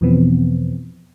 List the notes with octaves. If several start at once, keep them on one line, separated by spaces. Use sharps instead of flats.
E2 B2 E3 F3 B3 C4